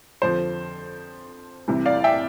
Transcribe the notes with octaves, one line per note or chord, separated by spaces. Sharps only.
F2 D3 F3 C5
C2 C3 E3
D5 F5
E5 G5